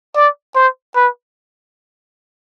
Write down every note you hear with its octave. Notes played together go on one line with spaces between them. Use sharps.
D5
C5
B4